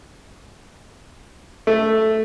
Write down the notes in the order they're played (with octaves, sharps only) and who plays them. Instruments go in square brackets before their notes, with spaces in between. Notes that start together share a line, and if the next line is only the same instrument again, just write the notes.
[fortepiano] A3